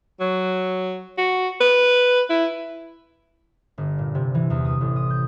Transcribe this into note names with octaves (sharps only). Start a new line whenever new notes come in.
F#3
F#4
B4
E4
G1
A#2
C3
E3
E2
D#6
A1
D#6
G6